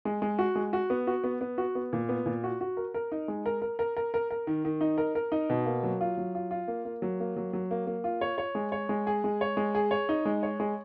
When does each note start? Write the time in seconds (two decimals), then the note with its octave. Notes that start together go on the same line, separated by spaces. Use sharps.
0.05 G#3
0.22 G#3
0.39 F#4
0.55 G#3
0.73 F#4
0.90 B3
1.07 F#4
1.24 B3
1.41 B3
1.58 F#4
1.75 B3
1.93 A#2
2.09 B3
2.26 A#2
2.44 F#4
2.61 F#4
2.77 A#4
2.94 A#4
3.12 D#4
3.28 G#3
3.46 A#4
3.62 A#4
3.79 A#4
3.97 A#4
4.14 A#4
4.31 A#4
4.47 D#3
4.65 D#3
4.81 D#4
4.98 A#4
5.15 A#4
5.32 D#4
5.50 B2
5.66 A#3
5.83 F#3
6.01 F4
6.17 F#3
6.35 F4
6.51 F4
6.68 A#3
6.85 A#3
7.02 F#3
7.20 A#3
7.36 F#3
7.53 F#3
7.71 A#3
7.87 A#3
8.04 F4
8.21 C#5
8.38 C#5
8.55 G#3
8.72 C#5
8.89 G#3
9.07 G#4
9.24 G#3
9.41 C#5
9.57 G#3
9.75 G#4
9.91 C#5
10.09 D#4
10.25 G#3
10.43 C#5
10.60 G#3